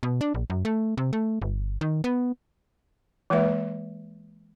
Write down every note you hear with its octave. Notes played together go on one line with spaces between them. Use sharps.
B2
D4
A#1
F#2
A3
C3
A3
G1
D#3
B3
E3 G#3 A#3 B4 E5